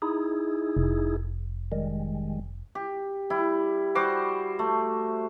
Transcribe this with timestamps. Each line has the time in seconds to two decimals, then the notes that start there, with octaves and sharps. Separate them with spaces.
0.02 D#4 E4 G#4
0.77 F1
1.72 D#3 G3 G#3
2.75 G4
3.30 G3 E4
3.95 G3 F#4 C5 D6
4.59 A3